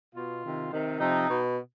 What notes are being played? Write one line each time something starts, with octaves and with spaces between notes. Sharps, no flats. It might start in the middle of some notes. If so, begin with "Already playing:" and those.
B2 F4
C3 D#3
C3 D#3
C3 F3 D#4
B2